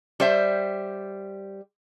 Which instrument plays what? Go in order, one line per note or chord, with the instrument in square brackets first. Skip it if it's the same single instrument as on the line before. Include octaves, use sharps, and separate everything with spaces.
[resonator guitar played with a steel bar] G3 C5 E5